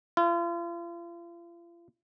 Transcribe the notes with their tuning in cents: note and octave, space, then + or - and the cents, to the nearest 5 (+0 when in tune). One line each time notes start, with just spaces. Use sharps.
F4 -40